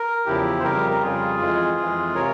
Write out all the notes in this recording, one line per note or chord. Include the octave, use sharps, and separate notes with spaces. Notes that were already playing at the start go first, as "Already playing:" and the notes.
Already playing: A#4
E2 C#3 F3 E4 G4
C5
F2 C#3 G3 G4 A#4
A#4
F2 C#3 G3 F4 G#4
F2 E3 G#3
F2 E3 G#3
C3 A#4 C#5